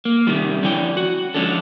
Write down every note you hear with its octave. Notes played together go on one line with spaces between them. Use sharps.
A#3
C3 D#3 G3
F2 D3 E3 C#4 G5
F#4
D3 F3 G#3 C#4 D4 A4